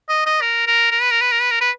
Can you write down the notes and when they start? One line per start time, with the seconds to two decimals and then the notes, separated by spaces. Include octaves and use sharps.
0.09 D#5
0.26 D#5
0.41 A#4
0.67 A#4
0.91 A#4
1.02 B4
1.11 A#4
1.21 B4
1.32 A#4
1.41 B4
1.51 A#4
1.61 B4